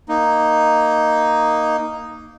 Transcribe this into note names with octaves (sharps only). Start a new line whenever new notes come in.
A#3 D#4